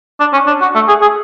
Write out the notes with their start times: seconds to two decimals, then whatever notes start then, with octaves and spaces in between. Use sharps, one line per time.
0.20 D4
0.33 C#4
0.47 D4
0.61 F#4
0.75 A3
0.88 G#4
1.02 G#4